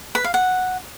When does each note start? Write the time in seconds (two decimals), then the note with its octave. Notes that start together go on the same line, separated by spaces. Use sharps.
0.15 B4
0.24 F5
0.34 F#5